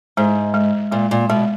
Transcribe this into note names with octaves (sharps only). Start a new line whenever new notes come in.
G#2 G#3
G#3
A#2 G#3
A#2
B2 G#3